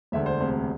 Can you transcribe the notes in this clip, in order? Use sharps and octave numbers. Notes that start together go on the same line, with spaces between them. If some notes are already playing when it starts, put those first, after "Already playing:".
E1 D2 D3 E5
C5
E1 D2 C3